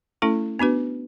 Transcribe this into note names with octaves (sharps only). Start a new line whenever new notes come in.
A3 C#4 E4 A4
B3 D4 F#4 B4